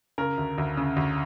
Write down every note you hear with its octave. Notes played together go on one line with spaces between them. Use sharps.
C#3 A#4
D2
D2
C#3
D2